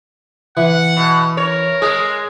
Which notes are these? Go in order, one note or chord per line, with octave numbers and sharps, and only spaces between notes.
E3 F#5
B2
A#4 C#5
G#3 G#4